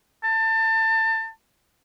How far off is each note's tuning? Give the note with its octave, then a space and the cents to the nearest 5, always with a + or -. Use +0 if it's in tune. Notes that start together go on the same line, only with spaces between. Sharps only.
A5 +30